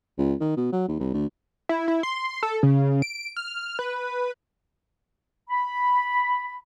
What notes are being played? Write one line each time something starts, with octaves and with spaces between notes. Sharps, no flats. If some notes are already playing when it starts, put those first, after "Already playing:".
C#2
D#3
B2
F#3
D#2
C2
D2
E4
E4
C6
A4
C#3
D7
F6
B4
B5